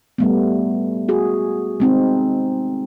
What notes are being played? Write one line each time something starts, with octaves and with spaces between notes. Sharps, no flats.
G3 A3 B3
F#4 G#4
G#3 C4 D#4